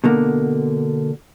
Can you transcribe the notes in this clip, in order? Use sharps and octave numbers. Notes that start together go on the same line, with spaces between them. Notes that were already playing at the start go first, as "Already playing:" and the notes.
B2 D3 A#3